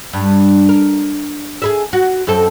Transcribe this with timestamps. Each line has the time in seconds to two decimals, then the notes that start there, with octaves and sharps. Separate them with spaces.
0.13 G2
0.69 A#4
1.62 G#4 A#4 E5
1.93 F#4
2.27 F#2 C4 A4